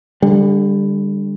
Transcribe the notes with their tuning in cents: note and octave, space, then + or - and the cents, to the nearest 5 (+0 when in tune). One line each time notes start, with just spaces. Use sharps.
D3 +0 G3 +30